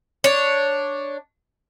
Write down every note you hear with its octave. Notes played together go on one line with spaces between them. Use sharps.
D4 C#5